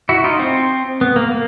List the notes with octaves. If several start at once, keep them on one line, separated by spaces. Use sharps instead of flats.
E4 F#4
D#4 F4
C4
B3
A#3
A#3